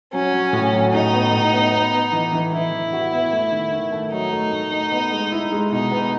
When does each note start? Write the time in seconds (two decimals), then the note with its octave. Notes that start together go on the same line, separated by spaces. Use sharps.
0.13 F#3 C#4
0.33 F#3
0.53 A2
0.73 F#3
0.93 A2 D#4
1.13 B3
1.32 A2
1.52 B3
1.73 B3
1.93 B3
2.12 E3
2.33 E3
2.52 E3 E4
2.72 E3
2.93 F#4
3.12 B3
3.32 A3
3.52 D#3
3.72 D#3
3.92 A3
4.12 F#3 D#4
4.32 A3
4.52 A3
4.72 A3
4.91 B3
5.12 G#3
5.32 E4
5.52 G#3
5.72 B2 D#4
5.91 B3